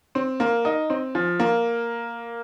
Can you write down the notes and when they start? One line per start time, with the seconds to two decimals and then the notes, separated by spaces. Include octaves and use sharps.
0.15 C4
0.40 A#3
0.65 D#4
0.90 C4
1.15 F3
1.40 A#3